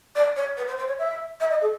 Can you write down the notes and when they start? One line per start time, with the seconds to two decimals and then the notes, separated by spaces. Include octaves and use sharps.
0.15 D5
0.36 C#5
0.57 B4
0.67 C5
0.77 C5
0.87 C#5
0.99 E5
1.40 E5
1.50 D#5
1.61 A4